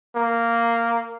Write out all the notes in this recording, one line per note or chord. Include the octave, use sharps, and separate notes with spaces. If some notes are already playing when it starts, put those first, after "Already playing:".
A#3